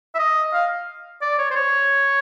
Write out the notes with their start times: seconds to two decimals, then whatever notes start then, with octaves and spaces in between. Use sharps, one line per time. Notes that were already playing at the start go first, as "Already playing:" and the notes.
0.15 E5
0.19 D#5
0.53 F5
1.21 D5
1.39 C#5
1.51 C5
1.55 C#5